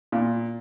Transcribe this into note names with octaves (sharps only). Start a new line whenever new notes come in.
A#2